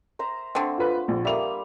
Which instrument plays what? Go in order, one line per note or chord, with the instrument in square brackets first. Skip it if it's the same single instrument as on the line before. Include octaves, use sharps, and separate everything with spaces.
[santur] C5 E5 A#5
[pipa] D3 C4 [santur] A3
[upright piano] F4 B4
A#1
[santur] G3 A#3 D#6 [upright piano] E5 F7